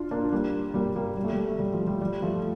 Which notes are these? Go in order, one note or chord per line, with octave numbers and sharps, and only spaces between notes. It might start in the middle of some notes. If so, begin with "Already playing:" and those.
Already playing: D4 F4
A#3 D4
G3 A#3
G3 A#3
G3 A#3
G3
A3
G3
A3
G3
F3
G3
G3
F3 A3